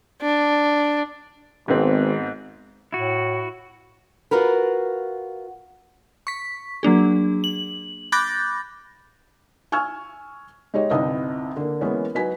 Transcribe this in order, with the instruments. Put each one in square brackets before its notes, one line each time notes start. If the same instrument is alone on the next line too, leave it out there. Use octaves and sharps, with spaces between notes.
[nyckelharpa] D4
[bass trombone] G#1 [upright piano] G#2 B3 C4
[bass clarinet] A2 [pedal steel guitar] E4 F#4
[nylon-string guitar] F4 F#4 A#4 B4
[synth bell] C#6 B6
F#3 A#3 D4 G#4
F#7
B5 D6 F#6 G6 A6 A#6
[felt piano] G#5 C#6 E6 F6 G#6
G#3 D#4 G4 C#5 D#5
G1 C2 C3 D#4 E4 D#6
D3 A#3
E3 G#3 A#3 B3 C#4
F#3 D#4 B4 G#5 B6